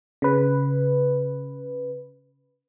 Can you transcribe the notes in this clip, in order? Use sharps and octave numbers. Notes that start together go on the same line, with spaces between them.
C#3 B4